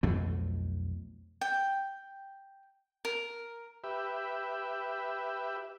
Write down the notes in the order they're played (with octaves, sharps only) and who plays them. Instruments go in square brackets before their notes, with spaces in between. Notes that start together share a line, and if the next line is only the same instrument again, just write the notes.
[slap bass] B1 F2 A3
[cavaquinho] G5
A#4
[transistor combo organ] G4 B4 E5